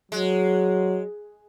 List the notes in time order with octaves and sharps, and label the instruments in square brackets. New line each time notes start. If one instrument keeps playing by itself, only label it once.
[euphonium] F#3 [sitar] G#3